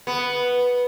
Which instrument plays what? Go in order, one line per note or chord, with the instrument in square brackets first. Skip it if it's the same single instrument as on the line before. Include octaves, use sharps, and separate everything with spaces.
[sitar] B3